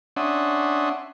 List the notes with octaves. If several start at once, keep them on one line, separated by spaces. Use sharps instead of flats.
C#4 D4 E5 F#5 C6 D#6